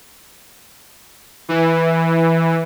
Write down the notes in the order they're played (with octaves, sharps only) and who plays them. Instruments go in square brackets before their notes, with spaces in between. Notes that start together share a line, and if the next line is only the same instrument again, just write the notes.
[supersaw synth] E3